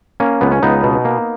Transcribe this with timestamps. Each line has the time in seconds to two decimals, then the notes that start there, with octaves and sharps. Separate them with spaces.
0.20 A#3 C#4
0.41 C#2 B3
0.51 C#4
0.63 C#2 B3 D#4
0.83 B2
1.05 A#3